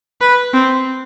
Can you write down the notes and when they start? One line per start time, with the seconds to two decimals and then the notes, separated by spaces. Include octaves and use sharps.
0.21 B4
0.54 C4